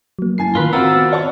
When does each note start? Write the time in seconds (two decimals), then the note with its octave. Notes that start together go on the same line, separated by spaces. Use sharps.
0.19 F#3 A#3
0.38 F#2 E3 G#5 A5 C7
0.55 A2 D#3 F4 A#4 B4
0.73 C4 F4 F#4 D5 F#5 A#5 E6 F6
0.96 B3
1.13 C#5 A5 C#6